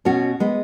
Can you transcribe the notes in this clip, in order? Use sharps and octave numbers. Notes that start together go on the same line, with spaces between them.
B2 C#4 F#4
G#3 B3